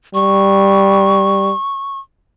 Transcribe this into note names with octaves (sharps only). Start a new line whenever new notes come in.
G3 C#6